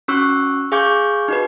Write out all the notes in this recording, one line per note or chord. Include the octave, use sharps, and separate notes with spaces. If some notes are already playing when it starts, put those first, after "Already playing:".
C#4 F#4 C#6 E6 F#6
G#4 F5 G#5 C#6 D6 G6
D#4 F#4 B4